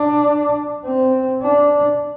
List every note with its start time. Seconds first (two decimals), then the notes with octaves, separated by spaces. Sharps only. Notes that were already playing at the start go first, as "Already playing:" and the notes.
Already playing: D4
0.85 C4
1.42 D4